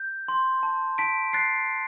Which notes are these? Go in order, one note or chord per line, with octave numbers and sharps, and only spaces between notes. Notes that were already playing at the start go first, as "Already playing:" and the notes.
Already playing: G6
C6
A5
A5 B6 D7
F#6 A6 C7